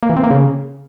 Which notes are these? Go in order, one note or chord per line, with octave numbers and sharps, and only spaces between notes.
A#3
E3
C4
A#3
C#3